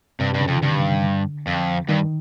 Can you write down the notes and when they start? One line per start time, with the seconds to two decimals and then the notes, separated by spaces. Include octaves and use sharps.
0.20 G2 C3
0.34 G2
0.41 C#3
0.48 F2
0.56 D#3
0.62 G2 D3
1.47 F2
1.89 G2 D#3